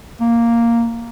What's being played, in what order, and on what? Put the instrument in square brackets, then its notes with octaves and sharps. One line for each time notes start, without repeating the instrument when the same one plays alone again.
[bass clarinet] A#3